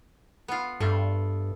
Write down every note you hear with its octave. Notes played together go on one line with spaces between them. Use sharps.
B3 F4
G2 A3 F4